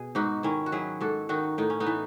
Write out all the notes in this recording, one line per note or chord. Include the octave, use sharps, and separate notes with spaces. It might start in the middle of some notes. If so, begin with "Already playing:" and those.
Already playing: B2 G#4
G#2 D#4 F#4
D#3 C#4 E4
F#4
F#3 E4 G#4
G#2 F#4 A4
D#3 D#4 F#4
A2 D#4
C#4
B3 D#4
E3